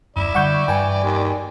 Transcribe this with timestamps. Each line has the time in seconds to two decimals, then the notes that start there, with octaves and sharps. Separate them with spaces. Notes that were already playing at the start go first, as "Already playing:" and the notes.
0.16 D#1 F#2 E4 D5
0.35 D3 G3 F#5 C#6 G6
0.68 G2 E3 G5 G#5
1.03 D#2